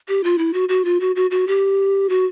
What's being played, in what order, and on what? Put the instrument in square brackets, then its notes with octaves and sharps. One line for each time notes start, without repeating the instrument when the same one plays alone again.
[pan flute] G4
F4
E4
F#4
F#4
F4
F#4
F#4
F#4
G4
F#4